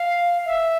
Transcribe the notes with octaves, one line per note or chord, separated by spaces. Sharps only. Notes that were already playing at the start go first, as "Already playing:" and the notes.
Already playing: F5
E5